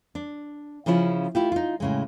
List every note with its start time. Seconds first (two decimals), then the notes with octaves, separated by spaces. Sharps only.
0.15 D4
0.86 C#3 F3 C#4 E4 F4
1.35 A3 E4 F4 G4
1.52 D#4 F4
1.80 A2 C#3 G#3